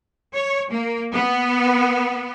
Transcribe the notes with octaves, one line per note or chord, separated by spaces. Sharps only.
C#5
A#3
B3